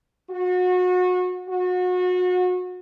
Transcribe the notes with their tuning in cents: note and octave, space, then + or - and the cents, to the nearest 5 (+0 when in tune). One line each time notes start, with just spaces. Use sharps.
F#4 -30
F#4 -30